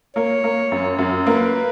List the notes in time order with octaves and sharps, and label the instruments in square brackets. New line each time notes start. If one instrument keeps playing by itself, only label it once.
[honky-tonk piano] A#3 [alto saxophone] C#5
[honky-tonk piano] A#3
F#2
F#2
[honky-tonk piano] A#3 [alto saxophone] B4